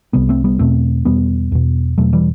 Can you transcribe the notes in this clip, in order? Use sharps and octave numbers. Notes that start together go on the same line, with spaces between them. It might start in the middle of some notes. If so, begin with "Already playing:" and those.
C2 C3 G3 B3
A3 C4
G3 B3
E2 B2 A3 C4
E2 B2 G3 B3
E2 B2
E2 B2 F#3 A3
E3 G3